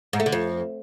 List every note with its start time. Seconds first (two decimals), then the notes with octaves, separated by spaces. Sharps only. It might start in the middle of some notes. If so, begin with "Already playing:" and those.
0.13 G#2
0.20 A3
0.26 D3
0.32 F2